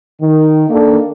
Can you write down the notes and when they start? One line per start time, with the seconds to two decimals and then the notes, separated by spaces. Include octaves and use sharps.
0.21 D#3
0.69 D#3 A#3 D4 A4